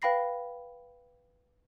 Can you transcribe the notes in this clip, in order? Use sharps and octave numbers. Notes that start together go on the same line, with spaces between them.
B4 F5 G5 B5 A#6 C7